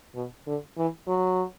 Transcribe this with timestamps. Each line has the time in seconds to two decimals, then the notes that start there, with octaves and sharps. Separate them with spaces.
0.15 B2
0.47 D3
0.77 E3
1.08 F#3